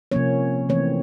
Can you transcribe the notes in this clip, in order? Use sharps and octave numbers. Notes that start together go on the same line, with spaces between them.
C3 F3 A#3 C#4 C#5
E3 A3 C4 C#5